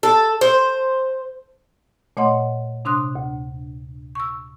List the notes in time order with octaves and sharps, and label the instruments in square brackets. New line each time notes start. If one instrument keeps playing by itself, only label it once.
[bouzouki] A4
C5
[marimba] A#2 A3 C#5 D#5 F#5 C6
C3 D4 C6 D#6 F#6
D2
C#6 E6